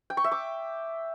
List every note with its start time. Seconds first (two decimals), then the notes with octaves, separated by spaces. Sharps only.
0.10 G5
0.17 C#6
0.24 E5
0.32 D6